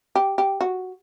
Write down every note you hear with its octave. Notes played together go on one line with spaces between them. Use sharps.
G4
G4
F#4